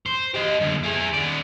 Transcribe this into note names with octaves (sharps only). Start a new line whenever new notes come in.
C5
G4 D#5
F#2 D3
E4 G#4
D#3 D5